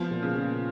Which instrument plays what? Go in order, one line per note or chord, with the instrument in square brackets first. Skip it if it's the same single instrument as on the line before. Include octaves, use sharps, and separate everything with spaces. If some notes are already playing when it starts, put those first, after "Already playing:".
Already playing: [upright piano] F3 [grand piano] B3
[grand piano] A#2
[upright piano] C#3
[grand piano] A#2